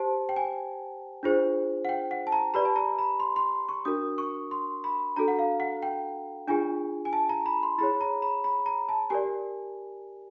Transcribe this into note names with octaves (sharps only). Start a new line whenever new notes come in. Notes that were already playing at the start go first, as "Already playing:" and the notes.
Already playing: G4 C5 A5
G5
G#5
D4 F4 G#4 C5
F#5
G5
F#5
A5
A#5
G4 B4 D5 B5
A5
A#5
B5
C6
C6
C#6
D4 F#4 A#4 D#6
C#6
C6
B5
D4 F#4 A4 A#5
F#5
F5
F#5
G5
D4 F4 G#4 G#5
G#5
A5
A#5
B5
C6
E4 G#4 C#5 B5
A#5
B5
B5
A#5
A5
G4 A#4 D5 G#5